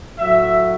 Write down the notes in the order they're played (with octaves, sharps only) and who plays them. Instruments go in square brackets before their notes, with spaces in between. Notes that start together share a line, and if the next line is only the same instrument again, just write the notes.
[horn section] A2 F#3 E5